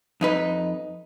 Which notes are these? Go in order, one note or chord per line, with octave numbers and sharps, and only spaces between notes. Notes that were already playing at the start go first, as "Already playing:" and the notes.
F2 D#4 B4